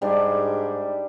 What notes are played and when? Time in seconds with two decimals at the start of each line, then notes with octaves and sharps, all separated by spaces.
0.02 G#2 G3 D4